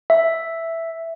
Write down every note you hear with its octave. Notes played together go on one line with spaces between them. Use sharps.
E5